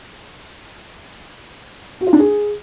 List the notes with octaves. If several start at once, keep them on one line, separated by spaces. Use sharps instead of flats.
F#4
F4
D4
G#4